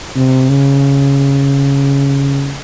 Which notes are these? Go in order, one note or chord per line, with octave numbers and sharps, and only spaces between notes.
C3
C#3